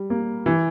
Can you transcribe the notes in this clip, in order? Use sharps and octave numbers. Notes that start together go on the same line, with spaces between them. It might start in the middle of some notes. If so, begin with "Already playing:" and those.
Already playing: G3
A#3
E3